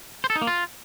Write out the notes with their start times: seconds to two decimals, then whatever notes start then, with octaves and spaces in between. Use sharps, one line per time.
0.24 C5
0.30 A4
0.36 D#4
0.41 A#3
0.47 F4